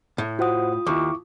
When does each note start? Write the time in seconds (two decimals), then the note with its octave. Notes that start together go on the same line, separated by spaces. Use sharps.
0.18 A2
0.39 F4 F#4 C5 F#5 D#6
0.87 D#2 E4 C#6 D6